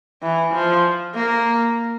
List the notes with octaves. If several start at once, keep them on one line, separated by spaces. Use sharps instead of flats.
E3
F3
A#3